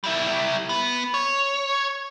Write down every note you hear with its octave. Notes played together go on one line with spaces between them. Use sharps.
G3 E4
B3
C#5